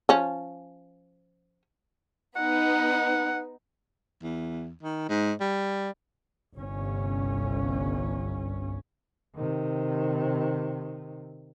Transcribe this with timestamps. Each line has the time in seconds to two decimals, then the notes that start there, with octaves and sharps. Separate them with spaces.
0.09 F3 C#4
2.36 B3 D#4 F#5
4.23 E2
4.83 D#3
5.09 G#2
5.41 G3
6.55 G1 C2 C#4
9.35 C3 D#3